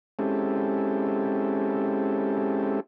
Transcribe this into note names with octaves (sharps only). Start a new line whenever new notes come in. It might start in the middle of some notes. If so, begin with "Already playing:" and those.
G#3 C4 C#4 E4 G4 A4